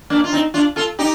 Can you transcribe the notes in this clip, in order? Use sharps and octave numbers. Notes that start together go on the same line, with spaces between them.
A#3 D4
F4
C4 D#4
D4 F4
F4 A4
D#4 G4